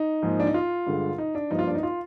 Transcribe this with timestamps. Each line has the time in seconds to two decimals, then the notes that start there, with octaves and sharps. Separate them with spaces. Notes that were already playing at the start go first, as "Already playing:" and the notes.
Already playing: D#4
0.22 G#2 F3 A#3
0.40 D4
0.47 D#4
0.54 F4
0.86 G2 D3 G#3
1.18 D#4
1.35 D4
1.51 G2 F3 A#3 D#4
1.59 F4
1.67 D4
1.75 D#4
1.83 F4